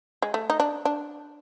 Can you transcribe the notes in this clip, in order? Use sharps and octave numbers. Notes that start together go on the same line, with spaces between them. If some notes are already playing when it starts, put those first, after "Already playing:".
G#3
A3
D#4
D4
D4